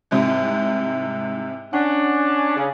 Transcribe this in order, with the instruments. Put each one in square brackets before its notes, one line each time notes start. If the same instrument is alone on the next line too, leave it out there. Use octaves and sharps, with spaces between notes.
[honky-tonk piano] C2 G#2 C3
[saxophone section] C#4 D4 [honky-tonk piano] F#5
[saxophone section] C#3